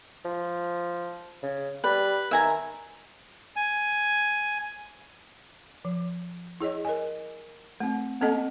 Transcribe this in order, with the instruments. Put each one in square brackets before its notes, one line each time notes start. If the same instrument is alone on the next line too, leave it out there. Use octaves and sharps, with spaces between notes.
[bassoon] F3
C#3
[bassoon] G3 [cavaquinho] B4
[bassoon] D#3 [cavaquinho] E5 G#5 A#5
[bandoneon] G#5
[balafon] F3
E4 G#4 C#5 D#5
A#4 D#5 G#5
A3 C4
A#3 C4 C#4 A4 D#5 F#5